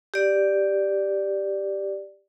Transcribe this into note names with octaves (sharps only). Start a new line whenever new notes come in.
G4 D5